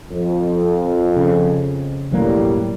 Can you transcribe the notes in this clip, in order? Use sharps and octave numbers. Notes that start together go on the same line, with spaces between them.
F2
C#3
E1 A2 F#3 G3 A#3